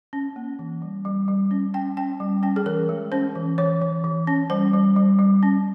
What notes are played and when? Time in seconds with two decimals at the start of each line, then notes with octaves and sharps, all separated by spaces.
0.13 C#4
0.36 A#3
0.59 E3
0.82 G3
1.05 G3
1.28 G3
1.51 C#4
1.74 C#4 G5
1.97 C#4 G5
2.20 G3
2.43 C#4 G5
2.56 G#4
2.66 E3 A#4
2.89 G#3
3.12 C#4 C5
3.35 E3
3.58 E3 C#5
3.81 E3
4.04 E3
4.27 C#4
4.50 G3 C5
4.73 G3
4.96 G3
5.19 G3
5.43 C#4